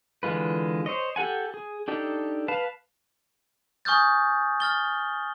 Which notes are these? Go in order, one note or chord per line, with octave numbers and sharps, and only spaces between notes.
D3 E3 G#3 F4 B4
C5 C#5 D#5
G4 A4 F#5 G#5
G#4
D4 D#4 G4 A4
B4 F5 A5
G#5 C#6 D#6 F6 G6 A6
F6 A6 G7